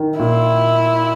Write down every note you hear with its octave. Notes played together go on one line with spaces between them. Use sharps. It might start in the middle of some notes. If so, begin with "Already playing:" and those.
Already playing: D#3
A#2 E4